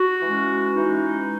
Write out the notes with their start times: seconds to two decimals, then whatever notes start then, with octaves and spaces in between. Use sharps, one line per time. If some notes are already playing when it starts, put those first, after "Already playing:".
Already playing: F#4
0.21 E3 G#3 C#4
0.76 E3 G#3 C#4 D#4